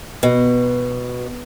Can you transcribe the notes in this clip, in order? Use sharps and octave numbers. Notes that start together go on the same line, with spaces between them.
B2